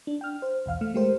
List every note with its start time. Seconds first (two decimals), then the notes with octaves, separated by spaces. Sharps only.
0.07 D4
0.21 G5 F6
0.42 C5
0.66 B1 E2 F5 F6
0.81 A3 F6
0.94 G#3 A3 G4 A#4 C5